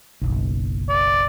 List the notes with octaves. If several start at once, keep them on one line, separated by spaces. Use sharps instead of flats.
F#1 B1
D5